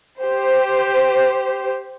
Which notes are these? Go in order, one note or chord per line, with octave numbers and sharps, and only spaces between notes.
G4 C5